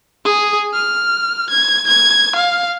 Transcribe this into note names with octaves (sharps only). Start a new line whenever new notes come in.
G#4
F6
G#6
G#6
F5